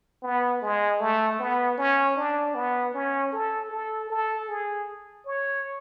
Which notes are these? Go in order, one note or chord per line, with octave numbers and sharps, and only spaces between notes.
B3
G#3
A3
B3
C#4
D4
B3
C#4
A4
A4
A4
G#4
C#5